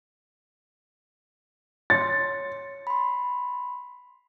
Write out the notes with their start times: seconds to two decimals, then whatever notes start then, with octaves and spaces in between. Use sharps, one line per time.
1.90 C#5 C6 A6 C#7
2.87 B5 C6